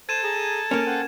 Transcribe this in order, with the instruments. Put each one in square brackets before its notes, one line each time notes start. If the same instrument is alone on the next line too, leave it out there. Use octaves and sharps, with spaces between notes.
[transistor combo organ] A4 [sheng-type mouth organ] C5 [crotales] G#6 D#7 E7
[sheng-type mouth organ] G#4 A#5
[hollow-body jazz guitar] A#3 C#4 [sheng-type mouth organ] A#4
[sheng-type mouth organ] C5 F#5 G5